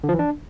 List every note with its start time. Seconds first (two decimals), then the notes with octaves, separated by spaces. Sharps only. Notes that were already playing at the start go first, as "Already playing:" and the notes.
0.04 D3
0.09 F3
0.14 E3
0.19 D4